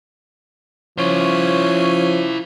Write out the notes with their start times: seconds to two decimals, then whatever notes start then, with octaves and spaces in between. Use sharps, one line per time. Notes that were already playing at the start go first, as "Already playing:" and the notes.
0.98 F3 C#4 E4 C5 C#5